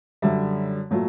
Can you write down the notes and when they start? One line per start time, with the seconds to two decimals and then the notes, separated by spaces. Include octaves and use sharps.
0.22 F#2 D3 G3 E5
0.91 A#2 F#3 A3